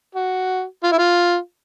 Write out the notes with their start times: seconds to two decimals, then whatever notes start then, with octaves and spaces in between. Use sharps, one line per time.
0.15 F#4
0.84 F4
0.91 E4
0.98 F4